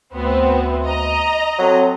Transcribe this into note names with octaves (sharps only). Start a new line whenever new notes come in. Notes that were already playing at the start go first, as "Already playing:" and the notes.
D2 B3 C4
D#5 A#5
F#3 C4 F#4 A4